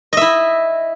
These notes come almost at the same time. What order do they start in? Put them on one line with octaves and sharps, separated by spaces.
D#5 E5 E4